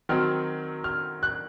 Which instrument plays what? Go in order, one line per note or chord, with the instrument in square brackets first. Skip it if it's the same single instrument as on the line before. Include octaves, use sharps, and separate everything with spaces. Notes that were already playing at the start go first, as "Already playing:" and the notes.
[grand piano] D#3 F#3 C4 F6
F6
F#6